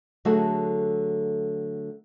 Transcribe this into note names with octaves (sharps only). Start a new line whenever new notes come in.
D3 F#3 A3 F#4 G#4 A4